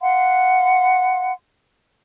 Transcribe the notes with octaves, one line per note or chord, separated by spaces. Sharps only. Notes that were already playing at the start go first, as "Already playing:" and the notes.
F5 F#5 C6